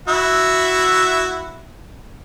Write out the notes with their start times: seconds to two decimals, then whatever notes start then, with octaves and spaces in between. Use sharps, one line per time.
0.08 E4 F#4 E5